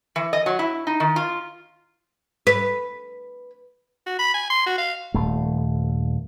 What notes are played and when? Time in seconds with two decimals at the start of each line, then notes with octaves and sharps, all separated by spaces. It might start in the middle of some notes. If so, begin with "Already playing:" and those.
0.16 E3
0.33 D#5
0.46 F#3
0.59 E4
0.87 D#4
1.00 D#3
1.16 F4
2.47 B4
4.06 F#4
4.19 B5
4.34 G#5
4.50 C6
4.66 F#4
4.78 F5
5.14 D#1 A3